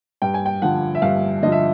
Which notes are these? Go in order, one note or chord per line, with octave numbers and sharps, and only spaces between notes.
G2 G5
G#5
G5
D3 F3 F#5
E5
G2 F5
D3 F3 D#5
E5